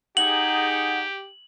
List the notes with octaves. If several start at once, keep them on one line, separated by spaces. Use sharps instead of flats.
D#4 G4 G#4 F#5 F#7